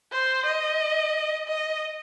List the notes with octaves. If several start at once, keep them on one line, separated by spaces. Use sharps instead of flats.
C5
D#5
D#5